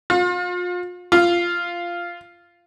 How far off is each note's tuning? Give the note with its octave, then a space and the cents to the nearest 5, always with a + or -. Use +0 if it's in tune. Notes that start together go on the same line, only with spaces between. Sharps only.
F4 +35
F4 -10